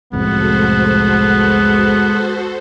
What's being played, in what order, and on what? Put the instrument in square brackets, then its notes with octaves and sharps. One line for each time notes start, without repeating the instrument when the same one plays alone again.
[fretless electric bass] C2 F2 A2 [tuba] G#3 [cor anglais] B3 [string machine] F#4 A4 C5